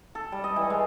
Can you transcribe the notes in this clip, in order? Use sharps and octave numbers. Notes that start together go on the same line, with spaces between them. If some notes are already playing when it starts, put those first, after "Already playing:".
A4
G3
D#5
E3
G#3